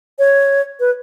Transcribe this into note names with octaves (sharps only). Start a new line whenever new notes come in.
C#5
B4